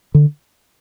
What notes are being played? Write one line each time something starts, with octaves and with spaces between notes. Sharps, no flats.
D3